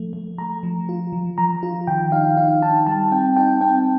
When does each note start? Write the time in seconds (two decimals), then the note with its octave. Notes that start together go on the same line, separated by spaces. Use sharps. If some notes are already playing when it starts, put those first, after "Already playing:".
Already playing: F3 A3
0.13 A3
0.38 A3 A#5
0.63 F3
0.89 F4
1.13 F3
1.38 F3 A#5
1.63 F4
1.87 D#3 G5
2.12 D#4 F5
2.37 D#4 F5
2.62 D#4 A5
2.87 G3 A5
3.12 C4 G5
3.36 D#4 G5
3.61 C4 G5